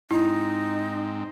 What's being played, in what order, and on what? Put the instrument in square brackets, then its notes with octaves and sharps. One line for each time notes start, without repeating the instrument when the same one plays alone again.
[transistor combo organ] G#2 C4 [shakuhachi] D#4 [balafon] E4